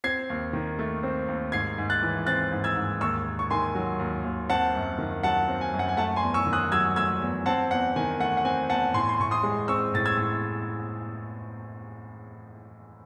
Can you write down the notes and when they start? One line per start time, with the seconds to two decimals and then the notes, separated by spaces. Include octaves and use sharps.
0.04 C4 G#6 C7
0.30 D#2
0.53 D#3
0.79 A3
1.03 C4
1.28 D#2
1.52 G#2 G#6 C7
1.78 G#2
1.90 F#6 A6
2.02 E3
2.26 C4 F#6 A6
2.52 G#2
2.64 E6 G#6
2.76 G#2
3.01 D#2 C#6 E6
3.26 D#2
3.39 C#6
3.50 D#3 G#5 C6
3.75 F#3
3.99 D#2
4.24 D#2
4.49 C4 F#5 A5
4.75 F#2
4.98 D#3
5.23 F#3 F#5 A5
5.48 C4
5.61 G#5
5.74 F#2
5.79 F#5
5.89 G#5
5.97 A3 F#5 A5
6.16 G#5 C6
6.22 E2
6.34 C#6 E6
6.47 D#3
6.53 D#6 F#6
6.72 F#3 E6 G#6
6.96 A3 E6 G#6
7.21 E2
7.46 C4 F#5 A5
7.71 E2 F#5
7.96 D#3 G#5
8.20 A3 F#5
8.37 F#5
8.45 C4 G#5
8.70 E2 F#5 A5
8.94 A2 G#5 C6
9.09 C6
9.20 A2 C#6
9.31 C6 D#6
9.43 G#3
9.68 C4 C#6 E6
9.94 A2 A6
10.06 E6 G#6
10.17 A2